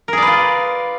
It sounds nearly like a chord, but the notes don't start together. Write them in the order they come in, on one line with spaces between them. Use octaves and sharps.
A#4 G#4 D5 B4 F4